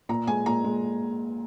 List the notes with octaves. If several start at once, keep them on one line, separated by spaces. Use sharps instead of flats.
A#2 A#5
G#3 G#5
A#2 A#5
G#3